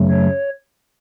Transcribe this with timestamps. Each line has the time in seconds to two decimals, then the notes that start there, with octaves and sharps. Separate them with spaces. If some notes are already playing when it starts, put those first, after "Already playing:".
Already playing: F#2 C#3 F#3 A3
0.10 C#5